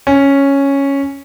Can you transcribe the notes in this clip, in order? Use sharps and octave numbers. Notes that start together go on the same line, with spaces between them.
C#4